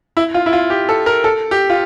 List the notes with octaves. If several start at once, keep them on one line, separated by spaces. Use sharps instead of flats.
E4
F4
E4
F4
G4
A4
A#4
A4
G4
F4